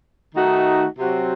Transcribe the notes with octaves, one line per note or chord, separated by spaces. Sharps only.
D#3 A3 D#4 F#4
C3 F#3 C4 F#4